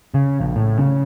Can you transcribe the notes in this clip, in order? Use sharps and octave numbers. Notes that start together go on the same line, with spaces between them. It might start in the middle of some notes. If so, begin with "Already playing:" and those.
C#3
A#1
A2
C#3